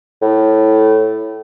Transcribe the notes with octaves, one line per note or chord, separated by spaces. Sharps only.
A2